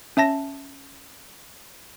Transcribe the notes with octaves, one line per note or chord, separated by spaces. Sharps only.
C#4 E5 A5 A#6